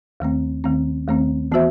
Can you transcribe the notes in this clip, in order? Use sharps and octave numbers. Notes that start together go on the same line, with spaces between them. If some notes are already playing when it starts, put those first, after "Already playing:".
D#2 D#3 A3 C4
D#2 D#3 A3 C4
D#2 D#3 A3 C4
E3 B3 F#4 C5 E5